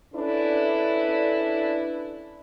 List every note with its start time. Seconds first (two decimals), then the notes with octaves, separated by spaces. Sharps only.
0.14 C#4 D4 E4 A4 B4 D5